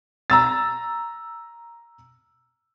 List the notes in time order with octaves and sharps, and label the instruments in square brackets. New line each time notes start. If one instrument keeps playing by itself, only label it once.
[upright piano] A#5 E6 A6